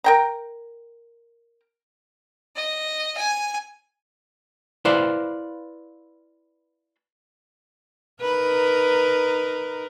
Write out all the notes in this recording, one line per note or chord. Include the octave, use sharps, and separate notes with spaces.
A#4 G5 A#5
D#5
G#5
E4 B4 C5 D5 F5
D#4 A#4 B4